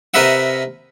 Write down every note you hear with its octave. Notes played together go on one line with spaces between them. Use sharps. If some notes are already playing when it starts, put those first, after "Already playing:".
C3 A#4 B4 D#5 E5 F#5